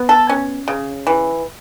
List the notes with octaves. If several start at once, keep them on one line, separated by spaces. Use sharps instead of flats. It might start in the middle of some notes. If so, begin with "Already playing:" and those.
Already playing: B3
A4
C#4
C#3
E3